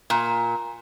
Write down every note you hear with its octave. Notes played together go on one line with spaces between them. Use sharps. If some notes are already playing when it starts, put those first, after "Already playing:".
A#2